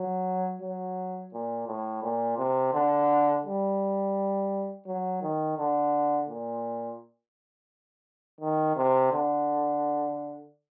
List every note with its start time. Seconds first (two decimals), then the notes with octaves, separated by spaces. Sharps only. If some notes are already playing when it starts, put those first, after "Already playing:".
Already playing: F#3
0.62 F#3
1.33 A#2
1.67 A2
2.03 A#2
2.38 C3
2.74 D3
3.46 G3
4.86 F#3
5.22 D#3
5.58 D3
6.29 A#2
8.41 D#3
8.76 C3
9.12 D3